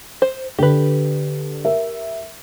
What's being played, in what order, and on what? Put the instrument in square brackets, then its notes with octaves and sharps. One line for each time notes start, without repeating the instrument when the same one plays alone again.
[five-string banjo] C5
[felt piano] D3 [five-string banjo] G4 B4
[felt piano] A#4 E5